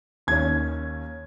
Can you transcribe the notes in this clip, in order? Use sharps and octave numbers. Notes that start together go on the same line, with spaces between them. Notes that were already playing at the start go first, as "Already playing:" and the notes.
D#2 D#3 C#4 G#6